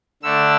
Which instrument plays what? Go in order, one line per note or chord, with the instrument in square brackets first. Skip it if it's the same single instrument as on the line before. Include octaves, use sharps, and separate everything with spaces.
[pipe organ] D3 A3 D4 E6